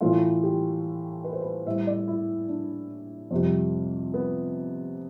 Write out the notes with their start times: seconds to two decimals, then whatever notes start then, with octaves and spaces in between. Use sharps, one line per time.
0.01 A2 E3 A3 F4
0.43 G4
1.24 B4
1.33 C5
1.41 B4
1.66 A2 G3 E5
1.87 D5
2.08 E4
2.48 D4
3.31 F2 C3 G3
4.14 B3